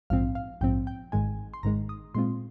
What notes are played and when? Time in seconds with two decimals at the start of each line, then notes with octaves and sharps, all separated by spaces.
0.10 A#1 G#2 F3 C4 F5
0.35 F5
0.61 A#1 G#2 F3 C4 G5
0.87 G5
1.12 G#1 G#2 D#3 G#3 G#5
1.54 C6
1.63 G#1 G#2 D#3 G#3 A#5
1.89 D#6
2.15 A#2 G#3 C4 F4 C6